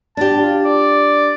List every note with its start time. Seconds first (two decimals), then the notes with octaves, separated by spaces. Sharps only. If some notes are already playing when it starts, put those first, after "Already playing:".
0.17 D4 G4 A5
0.42 F4
0.64 D5